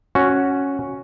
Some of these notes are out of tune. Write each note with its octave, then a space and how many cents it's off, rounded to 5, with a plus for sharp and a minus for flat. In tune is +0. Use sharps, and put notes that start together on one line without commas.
C#4 +0 F#4 +0